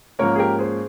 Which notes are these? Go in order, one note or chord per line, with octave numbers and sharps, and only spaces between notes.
G#2 F3 A#3 C#4 A#4 C#5
G#4
G4 A#4
G#4 C5